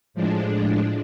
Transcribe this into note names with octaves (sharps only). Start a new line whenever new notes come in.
A2 F3 G#3 D4